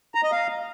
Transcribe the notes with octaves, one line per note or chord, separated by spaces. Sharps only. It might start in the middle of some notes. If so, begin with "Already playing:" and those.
A#5
D#5
F5